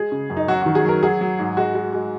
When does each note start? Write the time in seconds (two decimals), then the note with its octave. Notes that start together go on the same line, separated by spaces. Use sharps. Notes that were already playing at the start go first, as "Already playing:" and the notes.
Already playing: G#3 G#4
0.12 C#3
0.30 F#2
0.37 D#4
0.48 F#3 F#4
0.62 D#3 F#4
0.75 G#4
0.85 F#3 A#4
1.03 F#3 G#4
1.21 F#3
1.39 G#2
1.57 G#3 F#4
1.75 G#3
1.93 G#3